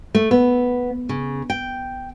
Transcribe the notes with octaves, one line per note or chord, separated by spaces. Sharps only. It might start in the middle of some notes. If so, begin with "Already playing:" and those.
A3
B3
C#3
G5